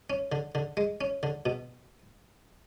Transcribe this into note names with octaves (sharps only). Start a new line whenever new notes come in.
C#4
D3
D3
G#3
C#4
D3
B2